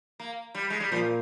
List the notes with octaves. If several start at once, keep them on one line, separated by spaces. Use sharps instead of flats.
A#3
G3
G#3
G3
A#2 F3